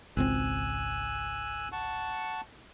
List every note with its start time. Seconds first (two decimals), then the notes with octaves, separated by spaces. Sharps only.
0.17 G#1 C#2 C4 G#5 E6 F#6
1.72 F#5 A5 C#6